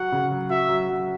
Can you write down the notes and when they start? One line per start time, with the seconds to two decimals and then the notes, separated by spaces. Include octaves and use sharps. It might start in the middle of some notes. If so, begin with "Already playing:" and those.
Already playing: F#3 F#4 F#5
0.12 C#3
0.31 F#3
0.50 F#4 E5
0.69 F#3
0.89 F#3